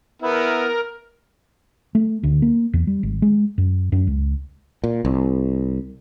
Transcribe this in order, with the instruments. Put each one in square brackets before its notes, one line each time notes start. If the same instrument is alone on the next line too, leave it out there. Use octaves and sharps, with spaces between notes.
[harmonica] B3 E4 [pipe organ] A#4
[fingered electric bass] A3
D2
A#3
E2
G3
G#1
G#3
F#2
F#2
C#2
[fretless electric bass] A#2
C2